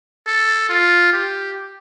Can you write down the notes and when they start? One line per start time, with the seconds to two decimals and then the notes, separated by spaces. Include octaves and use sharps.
0.27 A4
0.70 F4
1.13 G4